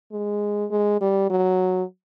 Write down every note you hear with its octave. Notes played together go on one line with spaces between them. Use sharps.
G#3
G#3
G3
F#3